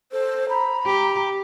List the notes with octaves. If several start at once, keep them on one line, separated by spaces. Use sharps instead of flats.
A4 C5
A#5 B5
G4